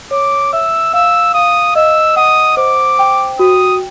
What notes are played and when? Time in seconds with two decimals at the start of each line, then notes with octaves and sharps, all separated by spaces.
0.11 C#5 D6
0.53 E5 E6
0.93 F5 E6
1.34 F5 D#6
1.75 D#5 E6
2.16 F#5 D#6
2.57 C5 D6
2.99 G5
3.39 F#4 D#6